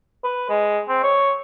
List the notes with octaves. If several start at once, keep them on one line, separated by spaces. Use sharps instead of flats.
B4
G#3
C4
C#5